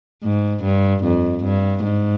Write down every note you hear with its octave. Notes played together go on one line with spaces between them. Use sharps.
G#2
G2
F2
G2
G#2